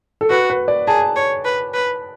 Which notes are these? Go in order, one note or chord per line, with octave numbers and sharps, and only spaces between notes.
A4
F#4 B4
B4
D5
G#4 A5
C#5
B4
B4